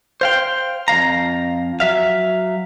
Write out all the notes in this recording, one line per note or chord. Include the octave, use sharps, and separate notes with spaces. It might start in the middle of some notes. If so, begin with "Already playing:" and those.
C5 F5 G5
F2 G#3 F5 A#5
F#3 E5 F5